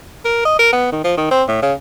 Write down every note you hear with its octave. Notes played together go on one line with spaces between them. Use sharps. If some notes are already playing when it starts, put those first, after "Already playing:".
A#4
D#5
A#4
B3
D#3
F3
D#3
C4
A2
C#3